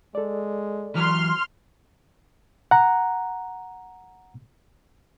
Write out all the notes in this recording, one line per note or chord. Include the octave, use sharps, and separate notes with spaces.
G#3 A4 D5
E3 F#3 C6 F6
F#5 A#5